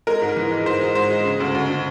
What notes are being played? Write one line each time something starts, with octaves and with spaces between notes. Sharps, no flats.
G#3 A#4
G#2
E3
G#3
G#2 C5
G#3
G#2 C5
G#3
C#3
D2
D2
C#3